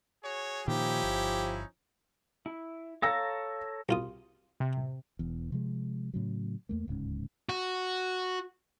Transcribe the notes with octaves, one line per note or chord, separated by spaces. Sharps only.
F#4 G#4 C#5
A#2 D#3 F3 C#4 D#4 E4 G4
G1
E4
A4 C#5 F5 A#5 E6 A#6
C2 F4 D#6
C3
E1 E2
C3 F3 G#3
A2 C#3 F#3
E2 A3 A#3
D1 C#2 G#2 C#4
F#4